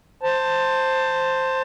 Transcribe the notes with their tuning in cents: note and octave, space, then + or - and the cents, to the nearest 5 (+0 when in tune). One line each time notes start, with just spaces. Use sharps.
C5 +0 A5 +15